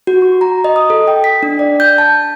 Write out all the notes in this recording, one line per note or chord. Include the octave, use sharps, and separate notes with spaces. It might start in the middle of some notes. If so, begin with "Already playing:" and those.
F#4
C#6
A#5
D#5
D#6
A4
G5
B6
D4
D5
G6
A5